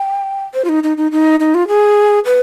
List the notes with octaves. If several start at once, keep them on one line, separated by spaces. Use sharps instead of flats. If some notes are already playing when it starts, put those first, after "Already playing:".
Already playing: G5
C5
F4
D#4
D#4
D#4
D#4
D#4
F4
G#4
B4